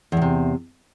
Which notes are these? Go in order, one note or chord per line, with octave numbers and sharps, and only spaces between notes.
E2 A2 C3